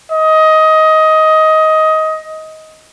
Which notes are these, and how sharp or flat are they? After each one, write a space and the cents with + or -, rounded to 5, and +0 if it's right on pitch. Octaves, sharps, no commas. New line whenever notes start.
D#5 +15